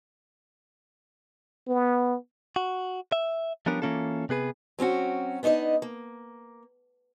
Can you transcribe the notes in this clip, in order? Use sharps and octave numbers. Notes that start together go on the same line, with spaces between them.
B3
F#4
E5
F3 G3 B3 C#4 D4 A#4
E3 G3 A#3 C#4 F4 A4
C3 B3 G#4 B4
F#3 C4 C#4 F#4
B3 D4 D#4 C#5 D#5
A#3